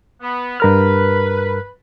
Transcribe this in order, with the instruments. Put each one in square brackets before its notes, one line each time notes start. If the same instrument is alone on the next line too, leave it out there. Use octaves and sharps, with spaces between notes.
[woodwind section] B3
[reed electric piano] G2 A#4 F6 [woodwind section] B4